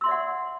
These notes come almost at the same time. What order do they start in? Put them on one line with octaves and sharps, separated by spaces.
E6 C6 E5 D5 F#5